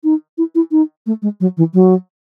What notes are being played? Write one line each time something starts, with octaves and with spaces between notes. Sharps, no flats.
D#4
E4
E4
D#4
A3
G#3
F#3
E3
F#3